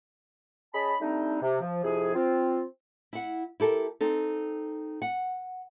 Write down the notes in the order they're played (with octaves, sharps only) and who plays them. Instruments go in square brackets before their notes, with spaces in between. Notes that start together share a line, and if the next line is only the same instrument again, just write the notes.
[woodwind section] C#4 G#4 D#5 A5 B5
G3 A3 C4 D4 D#4
C3
F3
F2 C3 F3 E4 G#4
C4 F4
[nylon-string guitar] E4 F#5
E4 G4 A4 A#4
C4 D#4 A4
F#5